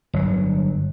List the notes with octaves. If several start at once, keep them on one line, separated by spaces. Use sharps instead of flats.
G1 F#3